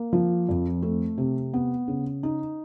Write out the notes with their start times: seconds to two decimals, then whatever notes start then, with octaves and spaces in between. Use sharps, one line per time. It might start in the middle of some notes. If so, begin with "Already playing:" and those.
Already playing: A#3
0.13 F3
0.49 F2
0.82 A3
1.18 C3
1.53 B3
1.88 C#3
2.23 D#4